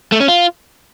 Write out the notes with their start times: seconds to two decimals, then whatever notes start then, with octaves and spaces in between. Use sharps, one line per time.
0.12 A3
0.20 C#4
0.28 F4